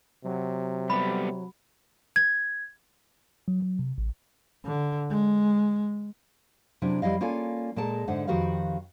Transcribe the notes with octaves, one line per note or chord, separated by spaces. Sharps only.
C3 F#3
G3 B3 B5
G#6
F#3
F#3
C3
A1
D3
G#3
C3 F#3 D4 E4
F2 G3 E4 D#5 F5
A#3 C#4 F4 A4 D5 G#5
A#2 G#3 A4 A#4 A5
G#2 D3 C5 E5 F#5
F2 D#3 F#4 G4 B4 F5